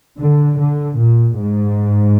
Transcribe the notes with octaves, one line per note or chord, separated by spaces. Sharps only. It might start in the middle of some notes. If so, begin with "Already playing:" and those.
D3
D3
A#2
G#2